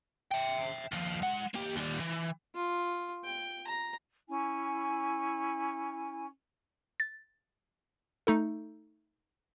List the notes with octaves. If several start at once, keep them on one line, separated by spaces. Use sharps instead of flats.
E5 G5
D#2 F3
G#3 F#5
A#3 G4
D#2 G3
E3
F4
G5
A#5
C#4 E4 G#5
A6
A3 D#4 A4